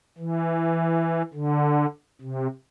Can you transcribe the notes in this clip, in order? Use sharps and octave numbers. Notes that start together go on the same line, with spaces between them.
E3
D3
C3